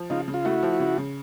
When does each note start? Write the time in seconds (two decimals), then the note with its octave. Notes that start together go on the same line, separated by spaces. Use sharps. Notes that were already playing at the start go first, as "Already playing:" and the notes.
Already playing: F3
0.10 C#3 D#4 F4
0.28 C#3
0.34 F4
0.45 A3 E4 F#4
0.63 F3
0.80 C#3
0.98 C#3